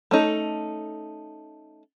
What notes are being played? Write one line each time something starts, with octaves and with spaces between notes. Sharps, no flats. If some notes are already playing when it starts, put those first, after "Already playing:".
A3 C#4 D#4 A4